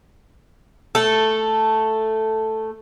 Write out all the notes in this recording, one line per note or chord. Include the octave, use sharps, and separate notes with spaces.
A3 A4